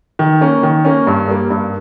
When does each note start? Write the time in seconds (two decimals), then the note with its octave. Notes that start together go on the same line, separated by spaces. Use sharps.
0.19 D#3
0.41 A#3 C#4
0.63 D#3
0.85 A#3 C#4
1.07 G2
1.28 G3 A#3
1.50 G2